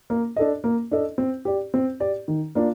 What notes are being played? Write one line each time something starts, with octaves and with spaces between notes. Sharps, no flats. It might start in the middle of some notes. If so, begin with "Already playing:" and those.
A#3
D4 A4 D#5
A#3
D4 A4 D#5
C4
G4 D5
C4
G4 D5
D#3
A#3 D4 F4